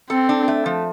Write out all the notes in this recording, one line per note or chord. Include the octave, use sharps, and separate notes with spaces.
C4 A4
D4
A3
F3